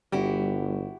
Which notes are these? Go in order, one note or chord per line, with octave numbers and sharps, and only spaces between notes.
G1 G3 E4 F#4 G4